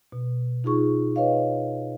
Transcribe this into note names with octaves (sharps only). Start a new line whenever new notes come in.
B2
D#4 F4 G#4 C#6
B4 C#5 D#5 F5